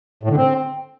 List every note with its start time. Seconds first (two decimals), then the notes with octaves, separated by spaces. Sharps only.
0.23 A2
0.30 D3
0.37 C4